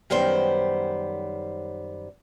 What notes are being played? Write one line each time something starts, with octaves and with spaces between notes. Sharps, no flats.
F#2 D#3 G3 B3 C5